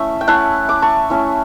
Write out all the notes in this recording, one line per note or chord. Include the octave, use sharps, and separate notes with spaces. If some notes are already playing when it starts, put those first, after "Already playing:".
Already playing: A3 C#4 E4 E5
G5
A3 C#4 E4 F#5 A5
D6
A5 C#6
A3 C#4 E4